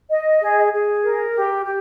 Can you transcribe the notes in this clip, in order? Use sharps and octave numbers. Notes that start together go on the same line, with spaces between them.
D#5
G#4
G#4
A#4
G4
G4